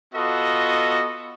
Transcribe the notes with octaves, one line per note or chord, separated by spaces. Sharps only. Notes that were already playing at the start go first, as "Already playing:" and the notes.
B3 F4 F#4 A4 D#5